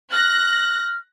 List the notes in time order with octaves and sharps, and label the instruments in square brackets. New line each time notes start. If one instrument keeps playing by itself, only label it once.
[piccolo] F6 [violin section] F#6 A#6